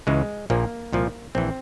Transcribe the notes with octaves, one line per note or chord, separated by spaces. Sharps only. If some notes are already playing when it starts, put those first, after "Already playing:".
C#2 C#3 E3 G#3
A#1 A#2 F3 A#3
C2 A#2 F3
A#1 E3 C4